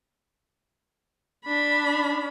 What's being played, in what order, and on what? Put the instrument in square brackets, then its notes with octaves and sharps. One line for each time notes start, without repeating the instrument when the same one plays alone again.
[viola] D4 B5